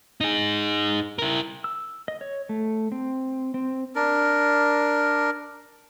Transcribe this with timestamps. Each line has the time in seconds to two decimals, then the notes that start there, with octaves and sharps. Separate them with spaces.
0.21 D#4 G#4
1.19 E4 A#4
1.64 E6
2.08 D#5
2.21 C#5
2.49 A3
2.92 C4
3.54 C4
3.96 D4 A#4